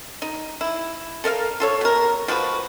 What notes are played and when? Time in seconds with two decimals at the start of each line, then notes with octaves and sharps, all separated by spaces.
0.22 D#4
0.61 E4
1.24 A4 A#4 D#5 F5
1.60 F4 A4 C#5
1.81 B2 A#4
2.28 F3 G#3 F#4 B4